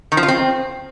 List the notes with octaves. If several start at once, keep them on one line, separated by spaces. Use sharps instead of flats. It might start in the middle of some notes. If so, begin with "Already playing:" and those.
D#3
F3
F4
C4